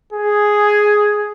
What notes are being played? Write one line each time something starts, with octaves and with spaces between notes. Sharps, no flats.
G#4